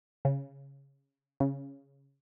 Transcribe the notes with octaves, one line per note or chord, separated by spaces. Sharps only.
C#3
C#3